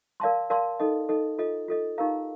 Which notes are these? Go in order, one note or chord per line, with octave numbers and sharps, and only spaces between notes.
A#4 D5 F5 A5 C6
A#4 D5 F5 A5 C6
D#4 A4 D#5
D#4 A4 D#5
F4 A4 D#5
F4 A4 D#5
D#4 G4 A#4 F5 A#5